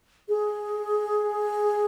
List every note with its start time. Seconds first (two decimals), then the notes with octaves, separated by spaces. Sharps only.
0.29 G#4